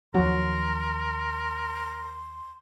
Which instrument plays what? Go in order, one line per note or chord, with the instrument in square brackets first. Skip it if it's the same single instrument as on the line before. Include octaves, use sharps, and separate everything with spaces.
[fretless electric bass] D#2 F3 [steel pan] F#3 F#4 [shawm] A#4 [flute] C6